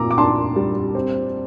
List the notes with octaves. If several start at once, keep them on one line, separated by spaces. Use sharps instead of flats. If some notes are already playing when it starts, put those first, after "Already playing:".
Already playing: A#2 F4 A#5 D6 E6
D6
D4 A5 C6
G3
C4